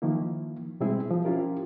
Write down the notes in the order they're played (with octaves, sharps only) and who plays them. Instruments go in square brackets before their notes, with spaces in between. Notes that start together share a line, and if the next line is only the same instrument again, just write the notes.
[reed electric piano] D#3 F3 A#3 E4
B2 G3 G#3 C4 E4 G#4
F3
C#4 E4 F4 G4 A#4